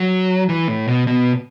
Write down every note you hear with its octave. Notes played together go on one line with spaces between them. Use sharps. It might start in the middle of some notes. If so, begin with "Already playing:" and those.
Already playing: F#3
E3
A2
B2
B2